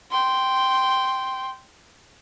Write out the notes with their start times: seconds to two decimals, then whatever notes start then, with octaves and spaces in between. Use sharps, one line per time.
0.11 G5 C6